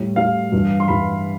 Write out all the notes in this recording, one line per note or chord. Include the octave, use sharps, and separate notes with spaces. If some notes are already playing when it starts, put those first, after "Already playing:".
Already playing: A2 G3
A2 G3 F5
G2 E3 G3
C6
G2 E3 G3 B5